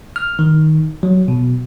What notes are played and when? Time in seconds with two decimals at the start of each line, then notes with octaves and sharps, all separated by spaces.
0.16 F6
0.39 D#3
1.03 F#3
1.28 B2